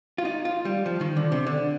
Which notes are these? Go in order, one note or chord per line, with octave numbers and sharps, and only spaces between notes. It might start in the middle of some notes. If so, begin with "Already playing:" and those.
F4
D#4
F4
G3
F3
D#3
D3
C3
D3